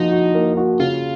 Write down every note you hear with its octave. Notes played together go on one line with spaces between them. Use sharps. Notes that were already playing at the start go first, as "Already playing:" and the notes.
Already playing: F3 A#3 D#4 F#4
F#4
A#3
F#4
C#3 F4